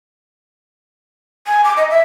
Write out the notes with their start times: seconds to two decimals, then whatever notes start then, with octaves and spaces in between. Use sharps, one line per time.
1.47 G#5
1.64 D6
1.76 D#5
1.90 E5